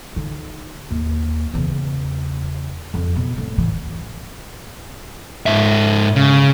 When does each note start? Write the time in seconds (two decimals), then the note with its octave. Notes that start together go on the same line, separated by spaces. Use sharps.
0.16 D3 D#4
0.91 D#2
1.54 E2 C#3
2.94 F2
3.16 B2
3.38 A2
3.58 E3
5.46 G#2 E5
6.16 C#3